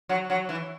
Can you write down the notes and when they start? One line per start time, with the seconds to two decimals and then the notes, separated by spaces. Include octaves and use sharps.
0.09 F#3
0.30 F#3
0.49 E3